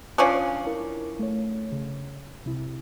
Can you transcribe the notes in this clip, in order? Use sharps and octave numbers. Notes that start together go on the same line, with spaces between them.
F3 C#4 D4
E4 A#4
A3 C#5
C#3
C2 C3 E4